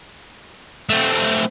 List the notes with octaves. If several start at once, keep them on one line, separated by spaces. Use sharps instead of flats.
A3 C4